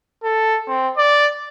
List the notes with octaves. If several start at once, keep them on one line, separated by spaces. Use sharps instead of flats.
A4
C4
D5